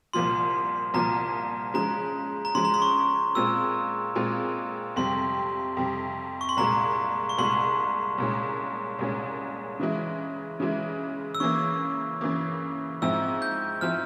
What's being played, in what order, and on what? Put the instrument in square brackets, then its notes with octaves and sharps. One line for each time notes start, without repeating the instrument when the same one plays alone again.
[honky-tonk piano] C2 A#2 F3 A#3 F4 [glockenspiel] C6
[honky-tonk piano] C2 A#2 F3 A#3 F4 [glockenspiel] A#5
[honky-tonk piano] C#3 F3 G#3 [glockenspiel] A#5
[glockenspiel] A#5
[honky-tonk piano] C#3 F3 G#3 [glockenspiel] C6
[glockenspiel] A#5
C6
C#6
[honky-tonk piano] A#2 G#3 C4 F4 [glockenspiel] E6
[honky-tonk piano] A#2 G#3 C4 F4
[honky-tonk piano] F2 C3 G3 [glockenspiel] C6
[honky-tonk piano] F2 C3 G3
[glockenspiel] C#6
C6
[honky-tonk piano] C2 A#2 G#3 [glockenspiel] A#5
[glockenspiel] C#6
[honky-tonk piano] C2 A#2 G#3 [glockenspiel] C6
[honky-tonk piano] C2 A#2 G#3 C#4
C2 A#2 G#3 C#4
C#3 E3 G#3 E4
C#3 E3 G#3 E4
[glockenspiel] E6
[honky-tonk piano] C#3 E3 A#3 [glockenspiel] C#6
[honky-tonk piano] C#3 E3 A#3
[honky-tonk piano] G#2 F3 C4 E4 [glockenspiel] E6
[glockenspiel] G6
[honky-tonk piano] F3 C4 E4 [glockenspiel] F6